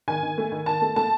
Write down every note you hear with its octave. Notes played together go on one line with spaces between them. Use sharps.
D#3 G#5
D#3
A3
D#3
D#3 A5
A3
A3 A5